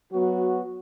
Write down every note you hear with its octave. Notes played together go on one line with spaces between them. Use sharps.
F#3 B3 F#4